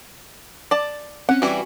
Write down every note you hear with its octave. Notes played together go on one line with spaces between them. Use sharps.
D5 A5
C4 C#4 F#5
E3 G3 F#4 G#5 C#6